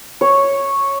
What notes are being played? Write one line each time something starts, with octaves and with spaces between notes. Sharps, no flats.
C#5